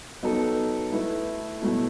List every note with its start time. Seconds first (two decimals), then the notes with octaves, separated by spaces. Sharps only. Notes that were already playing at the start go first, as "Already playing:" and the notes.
0.23 F#3 B3 D#4 A4
0.92 A3 E4 B4
1.62 B2 F#3 A3 E4 B4